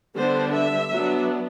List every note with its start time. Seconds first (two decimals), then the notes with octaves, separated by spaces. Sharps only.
0.16 D3 G3 B3 D4 C5
0.54 E5
0.91 F#3 B3 D4